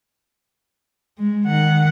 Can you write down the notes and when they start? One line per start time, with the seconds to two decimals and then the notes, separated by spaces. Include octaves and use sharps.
1.18 G#3
1.47 D#3 F#5